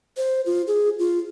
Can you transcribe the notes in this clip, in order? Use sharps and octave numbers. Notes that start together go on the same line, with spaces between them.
C5
F4
G#4
F4